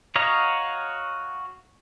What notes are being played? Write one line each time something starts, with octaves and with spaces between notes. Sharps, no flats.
F#4 C#5 D#5 F5 A#5